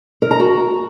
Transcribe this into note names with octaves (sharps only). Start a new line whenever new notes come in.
A#4
A#5
F#4